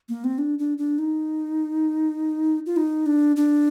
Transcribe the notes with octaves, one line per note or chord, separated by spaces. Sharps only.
A#3
C4
D4
D4
D4
D#4
F4
D#4
D4
D4